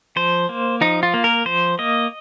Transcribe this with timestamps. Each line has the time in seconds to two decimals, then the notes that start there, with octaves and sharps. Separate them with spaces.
0.16 F3 C5
0.49 A#3
0.81 F3 D#4
1.03 F4
1.14 A#3
1.24 A#4
1.45 F3 C5
1.79 A#3 D#5